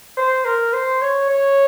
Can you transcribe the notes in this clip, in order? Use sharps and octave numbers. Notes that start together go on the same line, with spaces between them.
C5
A#4
C5
C#5
C#5